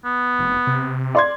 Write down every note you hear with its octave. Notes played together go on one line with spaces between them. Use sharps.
B3
F1
C3
D5 C6 G#6